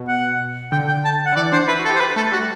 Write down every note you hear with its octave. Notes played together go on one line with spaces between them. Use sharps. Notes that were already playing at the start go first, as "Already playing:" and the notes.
Already playing: B2
F#5
D3 G5
G5
A5
F#5
D3
E3 D5
D4 C5
E4 B4
F#4
A4
G4
C5
B4
A3 A4
G3 F#4